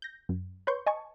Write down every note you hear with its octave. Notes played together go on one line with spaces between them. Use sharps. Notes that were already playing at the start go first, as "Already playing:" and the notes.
G6 A#6
F#2
B4 C#5 C6 C#6 G6
D#5 G#5 A5 C#6